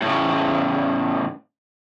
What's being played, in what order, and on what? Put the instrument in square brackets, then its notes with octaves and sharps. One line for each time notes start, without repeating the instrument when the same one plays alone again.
[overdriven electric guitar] A2 C#3